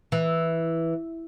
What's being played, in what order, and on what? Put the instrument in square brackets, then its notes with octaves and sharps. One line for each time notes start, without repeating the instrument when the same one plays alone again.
[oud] E3